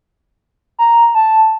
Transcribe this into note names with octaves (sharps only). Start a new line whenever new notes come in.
A#5
A5